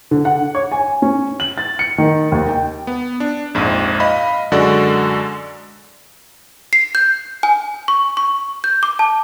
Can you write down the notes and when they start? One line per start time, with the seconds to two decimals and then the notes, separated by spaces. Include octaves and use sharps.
0.11 D3
0.25 F#5
0.55 C#5
0.72 G#5
1.02 C#4
1.40 F#7
1.58 A6
1.79 C#7
1.98 D#3
2.32 D#2
2.49 G5
2.87 B3
3.20 D4
3.55 A#1 F2 G#2
4.00 D#5 F5 B5
4.52 F#2 D3 G#3 F#4 A4 D5
6.73 C7
6.95 G6
7.43 G#5
7.88 C#6
8.17 C#6
8.64 G6
8.83 D6
8.99 A5